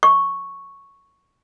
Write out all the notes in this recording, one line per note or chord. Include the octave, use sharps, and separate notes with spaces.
C#6